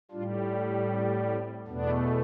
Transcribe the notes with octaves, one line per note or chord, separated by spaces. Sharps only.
A2 G3 D4 F4
C4
C4
E2 B2 A3 B3 D4